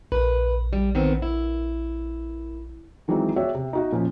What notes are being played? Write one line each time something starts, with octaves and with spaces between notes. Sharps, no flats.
A#1 A#4 B4
G3
D#3 B3 C4
E4
D#3 E3 F#3 G#3 C4 D#4
F#4 G#4 C#5 D5 E5 G5
C3
D#4 F#4 D#5
A#2 F3 C#4